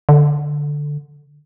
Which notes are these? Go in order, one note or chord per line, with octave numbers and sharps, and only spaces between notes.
D3